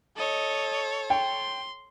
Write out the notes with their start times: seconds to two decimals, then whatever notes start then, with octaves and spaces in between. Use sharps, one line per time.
0.17 A4 C#5 D#5
1.10 G5 C6